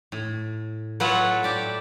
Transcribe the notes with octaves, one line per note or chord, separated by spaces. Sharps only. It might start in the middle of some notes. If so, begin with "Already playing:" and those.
A2
F#3 F4 A4 B4 C#5 F#5
G4 D5 E5